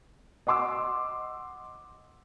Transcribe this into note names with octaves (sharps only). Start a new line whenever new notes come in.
D#5 F#5 C6 D6 E6